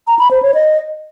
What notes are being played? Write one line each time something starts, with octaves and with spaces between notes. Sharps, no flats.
A#5
B5
C5
C#5
D#5